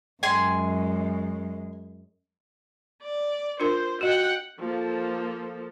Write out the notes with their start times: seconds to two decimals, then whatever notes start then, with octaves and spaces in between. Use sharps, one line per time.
0.23 F#2 G#3 G#5 C6
3.02 D5
3.60 D4 F4 A#4 C5
4.01 F#4 D#5 F#5 G5
4.59 F3 A#3 A4